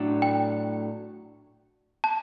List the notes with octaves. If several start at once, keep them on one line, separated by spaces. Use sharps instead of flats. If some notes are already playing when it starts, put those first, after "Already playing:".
Already playing: A2 F#3 A3 D4 A4
G5
A5